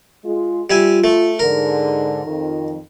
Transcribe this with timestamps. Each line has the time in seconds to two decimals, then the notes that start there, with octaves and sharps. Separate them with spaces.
0.24 G#3 F4
0.70 G3 F4 E5 G#5
1.04 A3
1.39 G#2 D3 A#4
2.24 F2 D#3